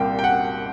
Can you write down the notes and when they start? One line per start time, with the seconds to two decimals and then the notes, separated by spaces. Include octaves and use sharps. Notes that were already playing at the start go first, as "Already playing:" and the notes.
Already playing: C2 A#2 G3 G5
0.19 G5
0.24 F#5